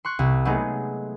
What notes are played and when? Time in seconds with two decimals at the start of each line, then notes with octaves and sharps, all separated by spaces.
0.05 C6 C#6 F#6
0.19 C2
0.45 F#3 G#3 A3 B3 D#4 G#4